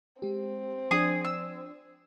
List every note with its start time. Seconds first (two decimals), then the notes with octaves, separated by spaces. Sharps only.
0.22 G#3 C4 G4
0.91 F3 D4 G#4 D5 G#5 D#6
1.25 E6